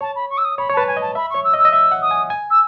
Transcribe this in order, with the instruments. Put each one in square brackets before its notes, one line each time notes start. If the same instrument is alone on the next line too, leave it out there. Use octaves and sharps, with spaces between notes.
[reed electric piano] C#5 [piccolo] A5
[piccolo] B5
C#6
E6
D#6
[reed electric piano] C#5 [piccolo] B5
[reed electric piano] C#5
[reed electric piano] B4 [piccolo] A5
[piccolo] G#5
[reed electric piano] D#5 [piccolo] A5
[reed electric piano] E5 [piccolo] B5
[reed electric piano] C#5 [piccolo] C#6
[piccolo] E6
[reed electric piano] D#5
[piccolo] E6
[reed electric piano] D#5
[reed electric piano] E5 [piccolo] E6
[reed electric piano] F#5
[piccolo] D#6
[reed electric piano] G#5
G#5
[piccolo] E6